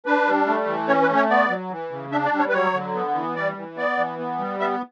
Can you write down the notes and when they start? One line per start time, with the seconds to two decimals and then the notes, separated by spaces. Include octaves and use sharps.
0.06 D4 B4
0.26 G3
0.47 A3
0.67 E3
0.88 C#4 C#5
1.02 B4
1.09 A3
1.16 C#5
1.30 B3 D5
1.49 F#3
1.71 E3
1.91 C#3
2.12 D4 E5
2.25 D5
2.33 G3
2.40 C#5
2.49 B4
2.53 F#3 C#5
2.74 D3
2.95 B3
3.15 E3
3.36 G3 D5
3.56 E3
3.77 B3 D5
3.97 E3
4.19 B3
4.39 G3
4.60 B3 E5